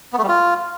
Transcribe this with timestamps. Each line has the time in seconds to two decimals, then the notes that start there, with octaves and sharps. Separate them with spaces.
0.13 B3
0.18 A3
0.23 G3
0.28 F4